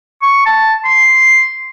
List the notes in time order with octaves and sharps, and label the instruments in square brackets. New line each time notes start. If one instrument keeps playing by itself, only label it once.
[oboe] C#6
A5
C6